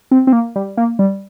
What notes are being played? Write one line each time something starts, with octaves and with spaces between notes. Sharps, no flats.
C4
C4
A#3
G3
A#3
G3